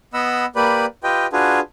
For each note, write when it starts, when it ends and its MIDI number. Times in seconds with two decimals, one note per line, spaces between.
0.14 0.46 59
0.14 0.46 75
0.14 0.46 78
0.14 0.46 83
0.14 0.46 88
0.56 0.86 58
0.56 0.86 67
0.56 0.86 71
0.56 0.86 74
0.56 0.86 83
1.04 1.26 65
1.04 1.26 67
1.04 1.26 71
1.04 1.26 75
1.04 1.26 79
1.33 1.60 62
1.33 1.60 65
1.33 1.60 66
1.33 1.60 68
1.33 1.60 71